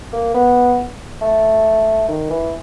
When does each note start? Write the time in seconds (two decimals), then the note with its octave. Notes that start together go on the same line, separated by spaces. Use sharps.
0.13 A#3
0.34 B3
1.21 A3
2.08 D#3
2.30 E3